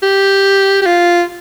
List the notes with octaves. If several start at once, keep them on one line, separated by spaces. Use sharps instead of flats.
G4
G4
F4